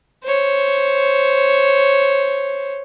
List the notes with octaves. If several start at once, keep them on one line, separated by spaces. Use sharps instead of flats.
C5 C#5